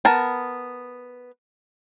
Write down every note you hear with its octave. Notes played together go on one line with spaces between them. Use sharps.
B3 A#4 A5